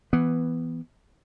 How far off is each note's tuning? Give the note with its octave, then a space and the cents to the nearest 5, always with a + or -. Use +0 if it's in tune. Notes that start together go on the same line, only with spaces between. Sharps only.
E3 +5 B3 +0